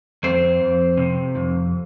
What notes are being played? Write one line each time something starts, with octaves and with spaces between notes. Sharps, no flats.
F2 C4 C5
F2
C3
F2